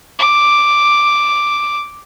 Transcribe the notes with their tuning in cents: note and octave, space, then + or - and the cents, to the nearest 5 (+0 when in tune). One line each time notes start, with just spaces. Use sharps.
D6 +0